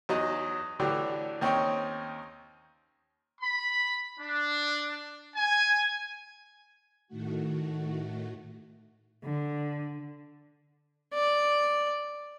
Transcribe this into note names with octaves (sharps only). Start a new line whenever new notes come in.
E2 F#3 D#4 D#5
A2 D3 E3 F#3 D4 G4
D#2 C4 C#4 D#4 C#5 G5
B5
D4
G#5
A2 D#3 A3 F#4
D3
D5